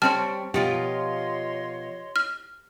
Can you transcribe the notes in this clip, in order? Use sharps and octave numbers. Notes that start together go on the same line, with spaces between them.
G3 C4 C#5 A5 F6
B2 F3 F4 G4 C#5 D#5 C6
F6